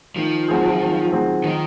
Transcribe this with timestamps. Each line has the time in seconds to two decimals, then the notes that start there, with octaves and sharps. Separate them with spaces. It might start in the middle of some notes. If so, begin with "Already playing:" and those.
0.16 D#3 F3
0.48 F#3 C4 F4 G#4
0.80 D#3
1.12 F#3 C4 F4 G#4
1.44 D#3 F3